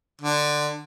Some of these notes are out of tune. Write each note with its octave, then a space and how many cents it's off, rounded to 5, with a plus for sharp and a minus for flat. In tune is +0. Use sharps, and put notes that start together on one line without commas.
D3 +15